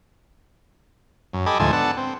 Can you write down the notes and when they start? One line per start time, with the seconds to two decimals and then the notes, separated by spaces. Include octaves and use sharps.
1.33 F#2
1.46 G4 A4 D#5 G#5 B5 D6
1.60 D2 G#2 F3 A3 G#5 A5
1.73 B3 D4 A4 F#5 A5
1.97 C4